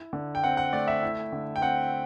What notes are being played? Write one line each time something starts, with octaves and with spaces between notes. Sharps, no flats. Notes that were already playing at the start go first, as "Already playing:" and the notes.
Already playing: E4
D3
G5
C4 F#5
F#5
A3 D5
E5
E4
D3
G5
C4 F#5